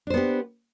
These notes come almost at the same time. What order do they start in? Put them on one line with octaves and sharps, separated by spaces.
D4 C5 B3 G4